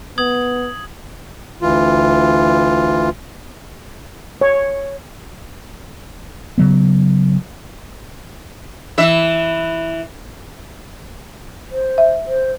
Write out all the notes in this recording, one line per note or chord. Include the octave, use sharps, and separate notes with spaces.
B3 D#6 G#6 F#7
D2 E3 F4
C#5
C#3 F#3 B3
E3 E5
C5
E5
C5